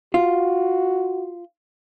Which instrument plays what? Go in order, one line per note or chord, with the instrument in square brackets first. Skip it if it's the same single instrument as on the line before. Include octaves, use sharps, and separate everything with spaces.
[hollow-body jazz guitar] F4 [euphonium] F#4